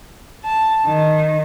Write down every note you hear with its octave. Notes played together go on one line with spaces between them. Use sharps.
A5
D#3